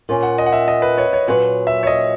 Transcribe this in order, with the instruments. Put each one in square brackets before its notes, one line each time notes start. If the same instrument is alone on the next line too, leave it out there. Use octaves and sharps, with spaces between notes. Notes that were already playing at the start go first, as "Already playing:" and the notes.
[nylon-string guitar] A#2 A#3 C#4
[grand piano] F#5
D#5
F#5
E5
D#5
B4
C#5
C#5
[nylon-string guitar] A#2 F#3 C#4 F#4 B4 [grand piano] C#5
[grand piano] E5
C#5
D#5